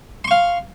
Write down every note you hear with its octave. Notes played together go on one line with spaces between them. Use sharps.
F5 C6 C#6